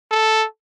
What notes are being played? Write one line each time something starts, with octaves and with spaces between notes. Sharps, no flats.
A4